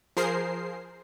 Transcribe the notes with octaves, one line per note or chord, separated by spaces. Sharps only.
F3 G#4 A#4 C5 C7